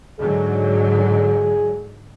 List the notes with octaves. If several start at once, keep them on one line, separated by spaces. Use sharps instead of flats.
G#2 D3 F#3 G#4